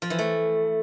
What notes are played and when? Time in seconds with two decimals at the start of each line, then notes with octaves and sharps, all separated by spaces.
0.02 F3
0.10 E3
0.19 A3